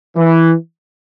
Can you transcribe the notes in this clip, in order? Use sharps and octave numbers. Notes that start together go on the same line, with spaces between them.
E3